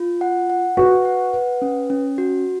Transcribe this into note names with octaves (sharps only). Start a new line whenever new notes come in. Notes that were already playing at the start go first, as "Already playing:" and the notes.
Already playing: F4
F#5
F#5
F#4 B4
F#5
B4
C#4
C#4
F#4